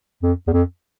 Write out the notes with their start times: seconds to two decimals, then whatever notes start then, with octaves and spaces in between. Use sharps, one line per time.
0.23 F2
0.47 E2
0.53 F2